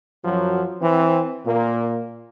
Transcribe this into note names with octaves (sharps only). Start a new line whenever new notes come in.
F#2 F3 F#3
E3 C4
A#2 A#3